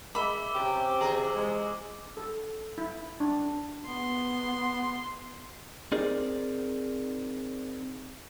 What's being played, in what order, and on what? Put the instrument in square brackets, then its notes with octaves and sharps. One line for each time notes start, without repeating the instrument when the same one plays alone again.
[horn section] G#3 [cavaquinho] E5 B5 [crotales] D6 E6 G7
[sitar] C3 [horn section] C4 C#4 G4
[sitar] E2 C3 G#4 [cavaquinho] A#5 [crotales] F#7
[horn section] G#3
[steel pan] A4
E4
D4
[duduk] B3 [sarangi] C6
[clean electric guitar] C4 D#4 G#4 A#4 D5